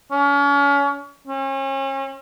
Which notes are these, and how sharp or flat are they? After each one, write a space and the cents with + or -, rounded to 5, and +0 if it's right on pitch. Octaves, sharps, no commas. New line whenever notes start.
C#4 +35
C#4 -35